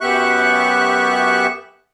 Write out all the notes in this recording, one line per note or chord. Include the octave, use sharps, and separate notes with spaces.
F#2 B3 G4 E5 C#6 F#6